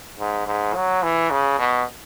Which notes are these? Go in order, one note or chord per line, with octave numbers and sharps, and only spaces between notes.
G#2
G#2
F#3
E3
C#3
B2